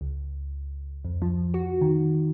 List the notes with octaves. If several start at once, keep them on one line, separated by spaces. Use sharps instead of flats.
C#2
F2
F3
F#4
D#3